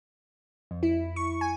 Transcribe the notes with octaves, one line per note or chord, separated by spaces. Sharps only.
F2
E4
C#6
G#5